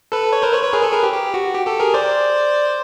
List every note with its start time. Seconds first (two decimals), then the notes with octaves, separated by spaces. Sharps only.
0.12 A4 B4
0.33 B4 C#5
0.42 A#4 C5
0.52 B4 C#5
0.62 B4 C#5
0.72 G#4 A#4
0.83 A4 B4
0.92 G#4 A#4
1.03 G4
1.14 G4
1.34 F#4
1.54 G4
1.67 G4 A4
1.80 G#4 A#4
1.94 C5 D5